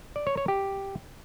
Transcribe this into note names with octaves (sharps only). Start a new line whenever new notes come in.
D5
C#5
C#5
G4